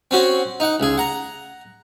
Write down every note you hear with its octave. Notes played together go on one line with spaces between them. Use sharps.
C4 C#4 F#4
D#4 F#5
C#2 G#4
F#5 A#5